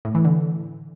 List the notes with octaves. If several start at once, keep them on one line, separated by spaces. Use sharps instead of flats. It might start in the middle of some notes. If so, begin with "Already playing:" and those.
A2
E3
D3